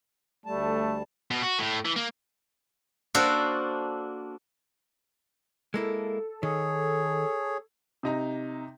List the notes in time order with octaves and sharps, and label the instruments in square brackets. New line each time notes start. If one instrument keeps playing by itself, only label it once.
[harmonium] D2 G3 A5 [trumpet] A3
[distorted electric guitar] B2
F#4
A2
E3
A#3
[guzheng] A#3 D4 F#4 A4 A#4 C5
[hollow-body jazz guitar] G#3 A#3 E4 [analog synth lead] A4
[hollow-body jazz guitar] D#3 [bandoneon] G#4 C#5
[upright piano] C3 D#4 A#5